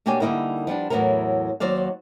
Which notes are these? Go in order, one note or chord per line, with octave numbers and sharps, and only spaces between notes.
B2 A#3 D4 G4 C#5 G#5
D3 G3 A#3 D#4 E4 A#4
F3 G3 B3 D4
E2 A2 F3 F#3 B3 A#4
D#2 F#3 C5 D5 F5